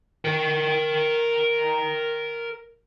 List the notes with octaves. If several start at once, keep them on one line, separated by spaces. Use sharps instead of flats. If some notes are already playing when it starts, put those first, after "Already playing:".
A#4 G5